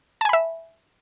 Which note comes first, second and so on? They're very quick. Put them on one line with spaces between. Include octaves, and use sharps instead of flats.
A5 G#5 B5 E5